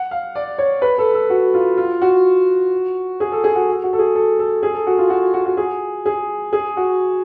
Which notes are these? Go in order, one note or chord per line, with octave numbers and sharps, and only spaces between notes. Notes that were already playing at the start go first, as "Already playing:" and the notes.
Already playing: F#5
F5
D5
C#5
B4
A4
A4
F#4
F4
F4
F#4
G#4
A4
G#4
F#4
F#4
A4
G#4
A4
A4
G#4
A4
F#4
F4
F#4
F#4
F#4
G#4
G#4
G#4
F#4